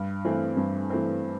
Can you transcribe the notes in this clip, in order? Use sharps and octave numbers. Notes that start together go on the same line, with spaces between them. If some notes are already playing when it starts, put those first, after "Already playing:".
Already playing: G2
E3 A3 C4
G2
E3 A3 C4